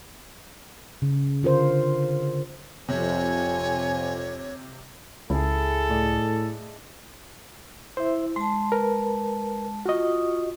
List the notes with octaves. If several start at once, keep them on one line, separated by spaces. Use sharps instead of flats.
C#3
D3 F4 A#4 C5
F2 C3 C#5 G#5
C#2 E4 G#4 A4
A2 D5 D#5 A5
E4 C5 E5
G#3 A5 C6
A#4 B4
F4 F#4 D#5 C#6 D#6